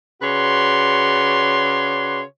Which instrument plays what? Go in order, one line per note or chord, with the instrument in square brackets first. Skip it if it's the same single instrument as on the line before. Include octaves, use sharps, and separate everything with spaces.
[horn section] C#3 F#4 B4 C#5 D5 C6